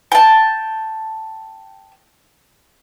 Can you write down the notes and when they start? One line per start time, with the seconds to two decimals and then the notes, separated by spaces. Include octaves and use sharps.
0.12 G5 A5